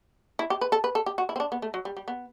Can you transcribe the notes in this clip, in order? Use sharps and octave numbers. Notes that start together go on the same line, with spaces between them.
E4
G4
B4
A4
B4
A4
G4
F#4
E4
C4
D4
B3
A3
F#3
G3
G3
B3